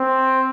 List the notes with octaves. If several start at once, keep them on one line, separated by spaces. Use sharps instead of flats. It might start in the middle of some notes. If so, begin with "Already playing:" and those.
Already playing: C4